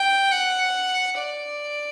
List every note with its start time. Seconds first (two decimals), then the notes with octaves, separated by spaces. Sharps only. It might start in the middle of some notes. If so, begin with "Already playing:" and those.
Already playing: G5
0.31 F#5
1.18 D5